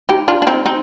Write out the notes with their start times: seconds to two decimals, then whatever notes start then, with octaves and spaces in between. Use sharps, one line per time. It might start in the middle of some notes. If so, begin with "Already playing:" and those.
0.09 D#4 G4
0.28 D4 F4
0.42 D4
0.47 C4 D#4
0.66 C4 D#4